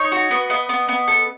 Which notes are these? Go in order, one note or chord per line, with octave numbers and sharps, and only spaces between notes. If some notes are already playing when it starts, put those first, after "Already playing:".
Already playing: D#4 C#5
F#4
B3
B3 D#5
B3
B3
A4